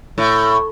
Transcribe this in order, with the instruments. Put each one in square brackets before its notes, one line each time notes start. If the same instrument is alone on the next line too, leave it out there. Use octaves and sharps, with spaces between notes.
[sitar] A2